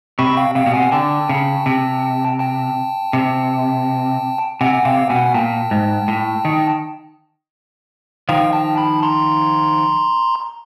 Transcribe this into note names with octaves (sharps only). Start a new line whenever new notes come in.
C3 B5 C#6
F5 G5
C3 F5 G5
B2
C3 F#5 G#5
D3 G5 A5
C#3
C3
G5 A5
C3
C3 F#5 G#5
F#5
C3 F5 G5
B2 F#5 G#5
G#5
A#2 G5 A5
G#2
A2
D#3
D#3 F3 F5 G5
G5 A5
A5 B5
A#5 C6